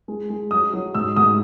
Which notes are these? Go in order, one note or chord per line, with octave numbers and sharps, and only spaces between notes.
G#3
G#3
F#3 D#6
F#3
G#2 E6
G#2 D#6